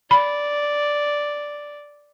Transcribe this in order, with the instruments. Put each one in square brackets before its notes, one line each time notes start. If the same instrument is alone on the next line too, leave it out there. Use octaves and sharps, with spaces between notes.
[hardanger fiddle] D5 [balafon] B5